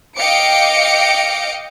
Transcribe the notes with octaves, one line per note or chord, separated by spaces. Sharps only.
D#5 F5 G5 D6 C#7 D7